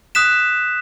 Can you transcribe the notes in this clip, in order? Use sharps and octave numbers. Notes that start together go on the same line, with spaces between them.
D#6 F#6 B6 E7